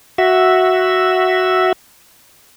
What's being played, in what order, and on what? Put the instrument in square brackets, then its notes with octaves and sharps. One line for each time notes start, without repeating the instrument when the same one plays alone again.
[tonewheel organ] F#4 E5